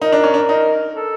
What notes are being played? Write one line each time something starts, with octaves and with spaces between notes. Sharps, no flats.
D#4 A#4
D4
C#4
D4
D#4
A4